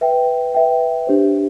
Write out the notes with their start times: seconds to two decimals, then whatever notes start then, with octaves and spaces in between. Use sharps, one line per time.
0.01 B4 E5 G5
0.55 B4 E5 G5
1.07 D4 G4 C5